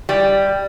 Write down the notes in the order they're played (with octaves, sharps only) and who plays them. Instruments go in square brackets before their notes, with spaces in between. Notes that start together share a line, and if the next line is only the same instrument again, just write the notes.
[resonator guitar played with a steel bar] G3